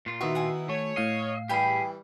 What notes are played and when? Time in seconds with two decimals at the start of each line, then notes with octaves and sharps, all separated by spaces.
0.06 A#2 F4
0.21 D#3 B3 D#4 E4 F#4 E5 F#6
0.35 F#5 G#5
0.69 A3 C#5
0.96 A2 D#5 F5 C7
1.49 E3 G3 G4 G#4 G5 G#5 B5